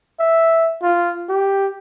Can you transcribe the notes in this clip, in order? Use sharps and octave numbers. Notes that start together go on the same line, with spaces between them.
E5
F4
G4